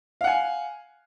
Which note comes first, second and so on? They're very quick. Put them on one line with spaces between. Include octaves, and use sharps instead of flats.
F5 F#5 G#5